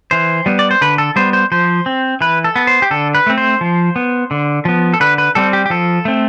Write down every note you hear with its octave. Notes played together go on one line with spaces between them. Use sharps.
E3 C5
G3 B3
D5
C5
D3 B4
A4
G3 B3 C5
C5
F3 C5
C4
E3 B4
A4
B3
C5
G4
D3 A4
B4
A3 C4
C5
F3
B3
D3
F3 B3
A4
D3 B4
B4
G3 C4 A4
G4
G4
F3 A4
A3 C4